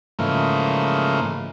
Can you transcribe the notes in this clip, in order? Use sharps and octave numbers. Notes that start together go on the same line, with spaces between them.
G#2 C#3 E3 F3 A3 A#3